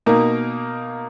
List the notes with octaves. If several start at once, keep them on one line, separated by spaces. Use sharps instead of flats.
B2 A#3 D#4 A#4